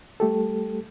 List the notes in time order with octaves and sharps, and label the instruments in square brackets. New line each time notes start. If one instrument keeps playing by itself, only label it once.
[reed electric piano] G3 A3 G4 A4